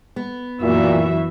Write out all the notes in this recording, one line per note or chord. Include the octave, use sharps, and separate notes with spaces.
B3
F#2 A#2 E3 F#4 E5